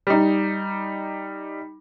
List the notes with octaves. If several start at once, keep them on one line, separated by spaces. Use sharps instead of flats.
G3 D#4